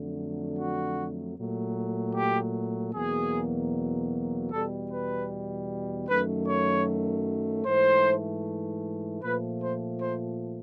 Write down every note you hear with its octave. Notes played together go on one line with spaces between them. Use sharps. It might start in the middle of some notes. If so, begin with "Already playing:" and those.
Already playing: F2 D3 F#3 A3
F#4
A#2 F#3 A3
G4
E2 B2 F#3 A#3 G#4
E2 B2 G3 A4
B4
F#2 D#3 F#3 A3 B4
C#5
G#2 E3 A3 C5
A#2 F3 A3 B4
C5
C5